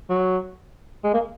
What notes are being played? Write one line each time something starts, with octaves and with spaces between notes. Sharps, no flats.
F#3
G#3
A#3